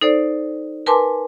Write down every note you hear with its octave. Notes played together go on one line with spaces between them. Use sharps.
D#4 A4 C5 D5
A#4 B4 G#5 A5 C6 D6